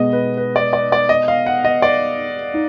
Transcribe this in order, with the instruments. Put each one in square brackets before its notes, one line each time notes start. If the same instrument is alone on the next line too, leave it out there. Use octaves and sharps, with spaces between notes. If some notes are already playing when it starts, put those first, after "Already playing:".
Already playing: [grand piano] B2 G#3 B3 [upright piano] D#5
[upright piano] B4
B4
D5
D5
D5
D#5
F5
F#5
D#5
D5
[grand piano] D#4